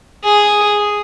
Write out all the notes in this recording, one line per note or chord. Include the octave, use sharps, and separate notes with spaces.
G#4